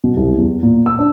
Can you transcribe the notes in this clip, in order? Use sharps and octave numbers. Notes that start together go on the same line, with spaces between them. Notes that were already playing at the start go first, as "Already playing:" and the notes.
B2
C2
E2
A#2
E6
D4